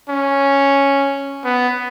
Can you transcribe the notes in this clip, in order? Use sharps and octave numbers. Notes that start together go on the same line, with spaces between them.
C#4
B3